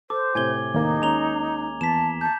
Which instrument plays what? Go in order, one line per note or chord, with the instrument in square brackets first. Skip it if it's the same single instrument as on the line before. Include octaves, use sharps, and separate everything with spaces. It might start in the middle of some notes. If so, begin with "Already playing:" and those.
[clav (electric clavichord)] A4 [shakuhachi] C5 [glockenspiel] D6
[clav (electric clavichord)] A2 C3 [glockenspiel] G#5 G#6 G7
[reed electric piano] D#2 A#3 [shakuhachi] D#4
[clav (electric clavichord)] G#3 C#4 [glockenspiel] A#5 F7 G7
[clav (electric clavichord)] E2 [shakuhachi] A5 [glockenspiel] B6 E7
[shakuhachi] A5 [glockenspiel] G6